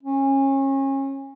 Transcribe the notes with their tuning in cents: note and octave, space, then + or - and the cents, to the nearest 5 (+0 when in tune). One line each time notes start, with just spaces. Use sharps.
C#4 -30